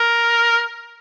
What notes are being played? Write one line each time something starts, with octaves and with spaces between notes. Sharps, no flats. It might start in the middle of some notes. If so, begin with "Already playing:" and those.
Already playing: A#4